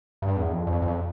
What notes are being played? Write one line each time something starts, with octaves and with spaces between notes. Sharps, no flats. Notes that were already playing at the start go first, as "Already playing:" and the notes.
G2
E2
F2
F2
F2